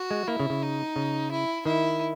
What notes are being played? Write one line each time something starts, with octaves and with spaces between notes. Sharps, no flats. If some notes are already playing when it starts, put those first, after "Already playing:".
Already playing: F#4
G#3
A#3 E4
C#3
C#3
D#4
C#3
E4
D#3 E4